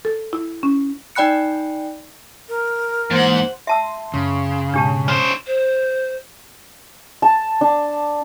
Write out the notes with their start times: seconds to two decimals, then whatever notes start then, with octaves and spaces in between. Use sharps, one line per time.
0.05 A4
0.33 E4
0.63 C#4
1.15 D#4 D5 G5 B5 F#6 C#7
2.49 A#4
3.11 G#2 E3 A#3 C5 F#5
3.67 E5 A5 C6 E6
4.14 F#2 C#3 C6
4.74 G#2 B2 D4 G4 A5
5.08 C#4 C5
5.46 C5
7.22 A5
7.61 D4